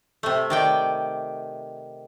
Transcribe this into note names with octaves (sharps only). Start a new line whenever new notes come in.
C3 A3
D#3 D5 G5